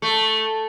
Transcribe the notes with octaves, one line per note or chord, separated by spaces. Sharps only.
A3